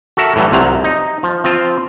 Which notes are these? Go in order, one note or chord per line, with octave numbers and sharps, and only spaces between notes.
F#4 A4 A#4 E5
A2 E3 F#3 G3
C2 C3 F3 F#3 A#5
D#4
F3
F3 C4 F4